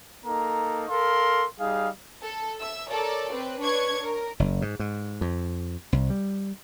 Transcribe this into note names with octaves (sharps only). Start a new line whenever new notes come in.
A#3 D#4 A4 A#5
A4 A#4 F5 C6
G3 D#4 G#4 F5
A4
E5 E6
A4 A#4 C#5 D5
C4 B4
D4 B4 C#5 C#6 G#6
A#4
F#1
G#2
G#2
F2
C2
G3